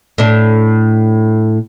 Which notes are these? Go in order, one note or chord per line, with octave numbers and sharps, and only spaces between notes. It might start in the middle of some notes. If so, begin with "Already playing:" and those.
A2 D4